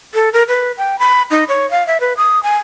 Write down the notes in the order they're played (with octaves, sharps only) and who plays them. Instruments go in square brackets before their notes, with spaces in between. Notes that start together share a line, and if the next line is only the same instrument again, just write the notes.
[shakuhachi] A4
A#4
B4
G5
B5
D#4
C#5
F5
E5
B4
D#6
G#5